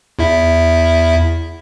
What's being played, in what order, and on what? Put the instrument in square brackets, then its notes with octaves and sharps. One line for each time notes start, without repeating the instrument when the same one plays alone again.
[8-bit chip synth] E2 E4 E5